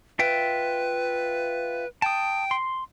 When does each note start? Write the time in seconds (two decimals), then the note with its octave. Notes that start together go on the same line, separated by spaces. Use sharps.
0.19 F4 B4 E5 G5
2.02 G5 A5 D#6
2.51 C6